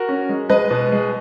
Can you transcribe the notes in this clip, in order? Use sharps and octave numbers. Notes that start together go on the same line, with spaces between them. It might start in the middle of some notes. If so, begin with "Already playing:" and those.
Already playing: F#4 A#4
C#4
G#3
G#3 B4 D#5
B2
G#3